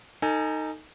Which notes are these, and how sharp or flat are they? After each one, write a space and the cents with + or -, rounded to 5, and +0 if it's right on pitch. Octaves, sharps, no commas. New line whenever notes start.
D#4 +0 A4 +35 G#5 +0